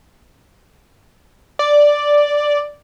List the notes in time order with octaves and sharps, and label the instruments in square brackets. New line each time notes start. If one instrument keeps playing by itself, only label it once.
[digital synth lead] D5